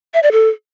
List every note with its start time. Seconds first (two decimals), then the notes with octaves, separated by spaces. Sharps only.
0.14 E5
0.23 D5
0.32 A4